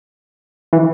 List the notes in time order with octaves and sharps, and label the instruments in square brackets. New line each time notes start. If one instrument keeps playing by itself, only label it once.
[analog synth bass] E3